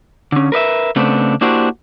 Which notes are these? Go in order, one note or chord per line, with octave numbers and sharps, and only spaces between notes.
D3 C#4
A#4 B4 D#5 E5
C#3 A3 B3 C4 D4
A#3 D4 E4 F#4 G4 C5